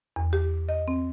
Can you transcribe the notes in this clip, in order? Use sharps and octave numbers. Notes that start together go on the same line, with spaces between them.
E2
G4
D#5
C4